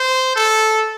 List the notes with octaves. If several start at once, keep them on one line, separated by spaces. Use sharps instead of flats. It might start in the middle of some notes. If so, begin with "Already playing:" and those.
Already playing: C5
A4